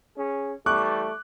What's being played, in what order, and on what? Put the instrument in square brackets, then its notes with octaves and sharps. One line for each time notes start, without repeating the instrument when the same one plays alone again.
[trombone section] C#4 G#4
[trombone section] E3 G3 A3 [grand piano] C#6 D6 F#6